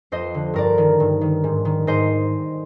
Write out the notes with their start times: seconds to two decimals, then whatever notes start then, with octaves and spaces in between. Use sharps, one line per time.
0.12 F2 C5 D#5
0.34 D3
0.54 G2 A#4 D5
0.78 D#3
1.00 G2
1.21 D#3
1.44 G#2
1.65 D#3
1.87 G#2 C5 D#5